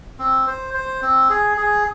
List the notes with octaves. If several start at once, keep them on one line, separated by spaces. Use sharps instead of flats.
C4
C5
C5
C4
G#4
G#4